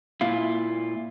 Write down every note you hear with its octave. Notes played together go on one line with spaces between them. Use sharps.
A#2 E4 F4